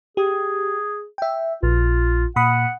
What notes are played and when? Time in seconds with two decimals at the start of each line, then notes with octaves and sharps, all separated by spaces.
0.17 G4 G#4
1.18 E5 G5
1.63 A#1 F4
2.36 A#2 F#5 B5 D#6